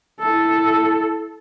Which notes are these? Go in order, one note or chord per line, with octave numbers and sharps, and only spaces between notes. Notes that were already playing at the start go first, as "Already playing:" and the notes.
E4 A4